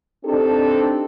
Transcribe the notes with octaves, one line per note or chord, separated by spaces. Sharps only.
C4 D4 D#4 G4 A4